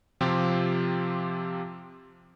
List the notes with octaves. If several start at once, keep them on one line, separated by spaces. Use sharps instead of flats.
C3 F3 C4 F4 G4